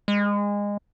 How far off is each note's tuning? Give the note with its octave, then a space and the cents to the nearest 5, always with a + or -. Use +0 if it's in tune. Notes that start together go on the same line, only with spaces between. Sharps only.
G#3 -25